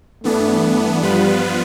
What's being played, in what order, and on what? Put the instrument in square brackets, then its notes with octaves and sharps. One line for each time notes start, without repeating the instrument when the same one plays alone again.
[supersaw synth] G2 E3 B3 D4 [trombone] A3
[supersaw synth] G2 F3 B3 F4 B4 [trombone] G3